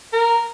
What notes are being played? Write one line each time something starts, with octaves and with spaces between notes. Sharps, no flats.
A#4